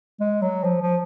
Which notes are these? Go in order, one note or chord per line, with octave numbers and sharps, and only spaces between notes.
G#3
F#3
F3
F3